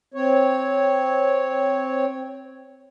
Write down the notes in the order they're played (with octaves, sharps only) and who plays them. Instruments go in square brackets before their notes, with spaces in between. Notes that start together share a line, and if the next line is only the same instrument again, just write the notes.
[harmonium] C4 C#5